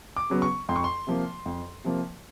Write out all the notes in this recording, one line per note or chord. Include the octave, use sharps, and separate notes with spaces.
D6
C#3 F#3 B3
C#6
F2 C6
C#6
C6
C3 F3 A#3
F2
C3 F3 A#3